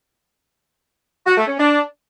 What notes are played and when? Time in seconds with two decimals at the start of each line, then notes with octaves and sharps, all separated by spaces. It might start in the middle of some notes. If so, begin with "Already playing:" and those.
1.26 F#4
1.37 A3
1.48 C#4
1.58 D4